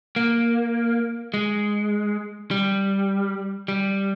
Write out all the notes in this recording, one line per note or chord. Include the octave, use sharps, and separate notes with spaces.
A#3
G#3
G3
G3